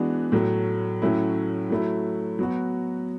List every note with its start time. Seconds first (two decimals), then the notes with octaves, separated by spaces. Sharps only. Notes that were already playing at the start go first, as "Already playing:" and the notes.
Already playing: E3 G#3 B3 D4 F#4
0.32 A2 F#3 A3
1.02 A2 F#3 A3 C#4 E4
1.70 F#3 A3 E4
2.39 F#3 B3 F#4